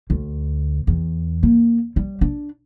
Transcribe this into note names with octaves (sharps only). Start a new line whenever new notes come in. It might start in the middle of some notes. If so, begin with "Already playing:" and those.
D2
E2
A#3
G3
D4